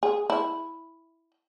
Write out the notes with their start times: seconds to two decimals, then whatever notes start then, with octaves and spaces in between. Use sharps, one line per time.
0.03 G#4
0.30 E4